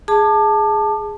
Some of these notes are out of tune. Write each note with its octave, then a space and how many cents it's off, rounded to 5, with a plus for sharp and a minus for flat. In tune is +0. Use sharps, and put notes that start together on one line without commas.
G#4 +0 A5 +0 D6 +35